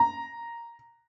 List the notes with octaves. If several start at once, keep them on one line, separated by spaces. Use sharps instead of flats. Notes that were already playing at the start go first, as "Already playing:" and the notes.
Already playing: A#5